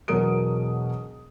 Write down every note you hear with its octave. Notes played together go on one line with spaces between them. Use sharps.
E1 B2 F#3 A#4 D#6 D7